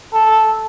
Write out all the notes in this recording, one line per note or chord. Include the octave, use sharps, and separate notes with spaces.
A4